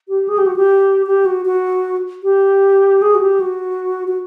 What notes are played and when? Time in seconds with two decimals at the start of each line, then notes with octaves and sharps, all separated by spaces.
0.09 G4
0.29 G#4
0.38 G4
0.46 F#4
0.56 G4
1.07 G4
1.26 F#4
1.45 F#4
2.23 G4
3.02 G#4
3.15 F#4
3.21 G4
3.40 F#4
4.08 F#4